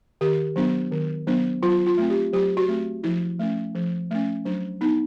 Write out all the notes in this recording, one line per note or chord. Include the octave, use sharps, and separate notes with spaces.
D#3 G4
F#3 B3 D4
D#3
F#3 B3 D4
F#3 F4
F4
A3 C4
G4
F#3 G4
F#4
A3 C4
F3 E4
A3 C#4
F3
A3 C#4
F#3 D4
B3 D4 D#4